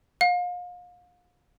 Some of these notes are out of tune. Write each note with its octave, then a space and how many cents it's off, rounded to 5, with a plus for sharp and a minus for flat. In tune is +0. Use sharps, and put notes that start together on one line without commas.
F5 +35